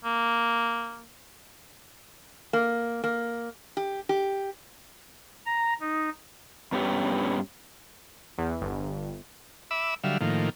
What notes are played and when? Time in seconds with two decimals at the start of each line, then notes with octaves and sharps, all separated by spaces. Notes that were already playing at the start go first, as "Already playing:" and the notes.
0.05 A#3
2.53 A#3
3.04 A#3
3.77 G4
4.09 G4
5.46 A#5
5.81 D#4
6.72 G2 B3 C#4 G4
8.38 E2
8.61 G1
9.71 E5 B5 D6 E6
10.04 D3 F#3 G3 E5 F5
10.21 A2 D#3 F3 A#3